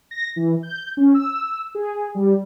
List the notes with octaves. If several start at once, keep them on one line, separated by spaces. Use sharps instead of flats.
A#6
E3
G6
C#4
E6
G#4
G3